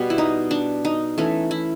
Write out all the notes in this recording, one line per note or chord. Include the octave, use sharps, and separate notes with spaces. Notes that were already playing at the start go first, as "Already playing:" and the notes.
Already playing: B2 G3 B3
E4
D#4
D4
D#4
E3 A3 C#4
E4